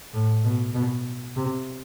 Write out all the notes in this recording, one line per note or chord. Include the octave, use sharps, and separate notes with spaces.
A2
B2
B2
C3